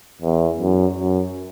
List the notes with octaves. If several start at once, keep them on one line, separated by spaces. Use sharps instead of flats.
E2
F#2
F#2